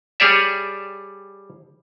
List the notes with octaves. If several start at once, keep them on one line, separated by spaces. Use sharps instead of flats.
G3 G#4 C#5 D5 E5